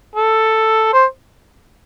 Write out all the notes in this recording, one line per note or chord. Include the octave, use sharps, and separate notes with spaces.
A4
C5